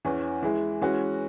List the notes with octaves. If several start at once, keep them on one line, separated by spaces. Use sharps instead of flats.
E2 E3 C#4
E3 G#3 E4
E3 G#3 C#4 F#4